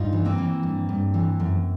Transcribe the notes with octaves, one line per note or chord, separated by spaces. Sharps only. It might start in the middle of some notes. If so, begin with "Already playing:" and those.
Already playing: G2 D#4 F4
E3
A#3 C4
E3
G2
G2
E3
F#2